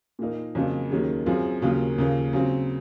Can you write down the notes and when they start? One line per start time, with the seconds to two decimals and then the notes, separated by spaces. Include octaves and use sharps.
0.19 A#2 F3 A#3 D#4
0.55 F2 C#3 F#3 A#3
0.91 D#2 D#3 F#3 C#4 G#4
1.26 F#2 F3 C4 F4 G#4
1.62 D#2 C#3 F#3 A#3 F4
1.98 D#2 C#3 F3 A#3
2.33 C#3 F#3 C4